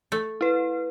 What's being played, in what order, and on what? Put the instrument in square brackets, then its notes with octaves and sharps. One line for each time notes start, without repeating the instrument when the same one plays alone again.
[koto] A3
[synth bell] E4 B4